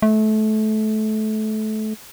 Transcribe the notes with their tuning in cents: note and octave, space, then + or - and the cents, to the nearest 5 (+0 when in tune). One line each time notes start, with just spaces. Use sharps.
A3 -25